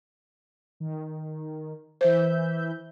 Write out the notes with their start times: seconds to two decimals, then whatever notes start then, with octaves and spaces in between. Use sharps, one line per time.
0.80 D#3
2.01 E3 C5 E5 G6